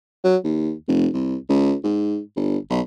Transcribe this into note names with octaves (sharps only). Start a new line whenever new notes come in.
F#3
D#2
F1
C2
C#2
G#2
G1
B1